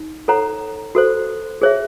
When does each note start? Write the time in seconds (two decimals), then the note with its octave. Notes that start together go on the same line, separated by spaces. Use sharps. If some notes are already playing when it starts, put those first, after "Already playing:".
Already playing: D#4
0.28 A4 C#5 F#5 A#5
0.95 F#4 A4 C5
1.62 G#4 C#5 E5